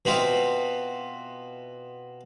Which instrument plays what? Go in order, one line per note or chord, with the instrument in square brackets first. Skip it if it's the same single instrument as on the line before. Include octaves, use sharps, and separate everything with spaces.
[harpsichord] B2 B3 C4 E4 F4